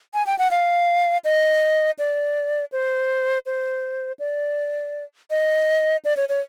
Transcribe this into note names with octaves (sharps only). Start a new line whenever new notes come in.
G#5
G5
F#5
F5
D#5
D5
C5
C5
D5
D#5
D5
C#5
C#5